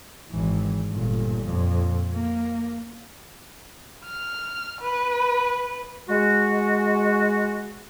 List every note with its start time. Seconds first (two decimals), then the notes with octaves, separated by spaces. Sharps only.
0.31 G#1 E3
0.90 G1 A#2
1.46 F2 A#2
2.14 A#3
4.04 F6
4.80 B4
6.09 G#3 F#4